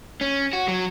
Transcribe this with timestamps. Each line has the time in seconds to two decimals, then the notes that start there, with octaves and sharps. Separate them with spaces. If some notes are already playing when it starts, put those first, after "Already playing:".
0.21 C#4
0.53 F#4
0.68 F#3